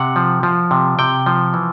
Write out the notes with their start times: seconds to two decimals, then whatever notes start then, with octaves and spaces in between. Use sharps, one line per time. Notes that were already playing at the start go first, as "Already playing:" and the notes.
Already playing: C3 F#5
0.16 F3
0.43 F3
0.71 C3
0.99 C3 G5
1.26 F3
1.54 E3